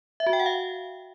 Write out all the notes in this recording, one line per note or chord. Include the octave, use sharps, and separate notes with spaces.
E5
F#4
G5
F#5
F5